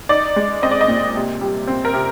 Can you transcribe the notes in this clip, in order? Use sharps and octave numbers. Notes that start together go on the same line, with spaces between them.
D#4 D5
G#3
C4 D#5
D5
D#5
A#2
C3
G3
C4
A#4
C3